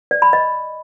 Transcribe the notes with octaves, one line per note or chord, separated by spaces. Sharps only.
D5
B5
D#5